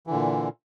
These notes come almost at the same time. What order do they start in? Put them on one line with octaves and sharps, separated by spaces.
E3 D3 A#2